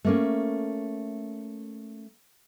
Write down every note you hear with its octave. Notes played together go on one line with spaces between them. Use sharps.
A3 A#3 C#4